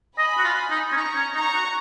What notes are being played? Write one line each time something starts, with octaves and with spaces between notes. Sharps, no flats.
D#5 G#5 B5
F#4
F4
D#4
C#4
D#4 A#5 C#6
C#4
D#4 A#5 C#6
F#4